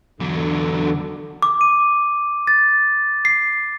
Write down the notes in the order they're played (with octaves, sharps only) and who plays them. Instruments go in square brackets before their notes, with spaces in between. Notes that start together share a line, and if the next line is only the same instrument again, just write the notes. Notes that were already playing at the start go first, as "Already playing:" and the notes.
[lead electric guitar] E2 F#3 [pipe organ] D3
[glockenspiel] D6
D#7
A6
C7